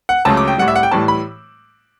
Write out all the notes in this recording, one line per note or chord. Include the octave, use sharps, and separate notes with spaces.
F#5
C#2 C#3 F#3 A3 A5
D6
G5
A2 G3 F#5
E5
F#5
G5
A2 E3 G3 A5
B5